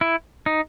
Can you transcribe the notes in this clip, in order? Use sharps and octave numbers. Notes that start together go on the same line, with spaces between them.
E4
D#4